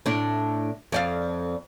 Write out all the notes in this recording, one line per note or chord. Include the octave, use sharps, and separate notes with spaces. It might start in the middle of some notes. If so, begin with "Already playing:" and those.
A2 D4
F2 D5 F5